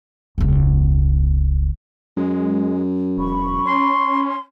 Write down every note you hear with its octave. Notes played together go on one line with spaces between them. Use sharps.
E1 C#2
F#2 G#3
E1 B5 C#6
C#4 C6